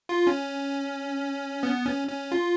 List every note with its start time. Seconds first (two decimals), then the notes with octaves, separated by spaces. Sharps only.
0.09 F4
0.27 C#4
1.63 B3
1.86 C#4
2.08 C#4
2.32 F4